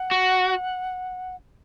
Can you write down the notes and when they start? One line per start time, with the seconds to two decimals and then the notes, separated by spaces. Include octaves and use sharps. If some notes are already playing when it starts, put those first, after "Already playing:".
Already playing: F#5
0.11 F#4